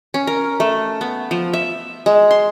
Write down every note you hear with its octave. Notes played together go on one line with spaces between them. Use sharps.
C#4
A#4
A3
B3
F3
E5
G#3
C6